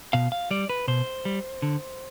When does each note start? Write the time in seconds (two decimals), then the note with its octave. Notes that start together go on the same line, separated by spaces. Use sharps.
0.13 B2 F5
0.32 F5
0.51 G3 D5
0.69 B4
0.88 B2 C5
1.25 G3
1.62 D3